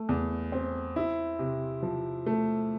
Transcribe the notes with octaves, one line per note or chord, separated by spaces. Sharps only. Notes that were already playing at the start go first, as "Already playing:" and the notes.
Already playing: A3
E2
C4
E4
C3
F3
A3